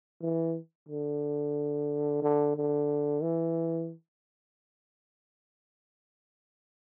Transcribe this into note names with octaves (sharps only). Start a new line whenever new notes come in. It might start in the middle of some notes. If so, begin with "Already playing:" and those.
E3
D3
D3
D3
E3